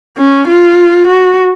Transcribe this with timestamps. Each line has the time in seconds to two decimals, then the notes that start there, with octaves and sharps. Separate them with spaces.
0.18 C#4
0.48 F4
1.07 F#4